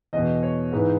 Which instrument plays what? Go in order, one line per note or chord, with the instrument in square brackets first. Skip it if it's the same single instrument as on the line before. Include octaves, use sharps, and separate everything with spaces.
[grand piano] E2 B2 D#5
C#5
G#2 E3 B4